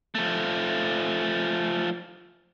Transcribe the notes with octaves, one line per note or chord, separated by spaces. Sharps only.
F3 A3